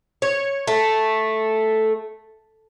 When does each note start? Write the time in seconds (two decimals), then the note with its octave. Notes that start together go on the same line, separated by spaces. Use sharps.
0.22 C#5
0.67 A3